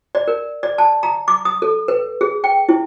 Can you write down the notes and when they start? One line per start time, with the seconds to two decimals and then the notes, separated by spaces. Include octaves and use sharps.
0.15 D5
0.28 A#4
0.63 D5
0.78 A5
1.03 A#5
1.28 D6
1.45 D#6
1.62 A4
1.88 B4
2.21 G#4
2.44 G5
2.69 E4